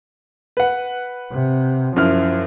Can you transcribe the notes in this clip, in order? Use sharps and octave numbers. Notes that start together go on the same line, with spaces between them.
B4 F#5
C3
F#2 F3 E4 F6